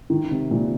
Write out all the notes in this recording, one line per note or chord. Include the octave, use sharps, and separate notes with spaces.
D#3
C3
A#2